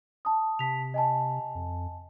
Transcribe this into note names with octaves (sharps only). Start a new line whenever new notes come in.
A5 D#6
C3 A5 B6 F7
D#5 G#5 A5
F2